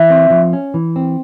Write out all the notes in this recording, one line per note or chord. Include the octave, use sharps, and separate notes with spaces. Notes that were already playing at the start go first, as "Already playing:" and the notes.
Already playing: E3 E5
C4
F3
C#4
E3
C4